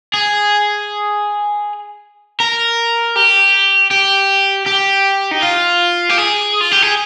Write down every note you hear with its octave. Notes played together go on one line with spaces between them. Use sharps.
G#4
A#4
G4
G4
G4
D#4
F4
G4
G#4
F4
G4
G#4